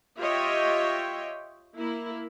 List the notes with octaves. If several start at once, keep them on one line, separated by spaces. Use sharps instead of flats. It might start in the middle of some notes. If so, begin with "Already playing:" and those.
F4 G4 C#5 D#5 E5 G5
A#3 E4